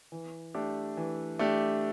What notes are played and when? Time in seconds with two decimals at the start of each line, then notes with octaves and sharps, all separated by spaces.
0.12 E3
0.54 A3 D4 G4
0.97 E3
1.39 A3 D4 G4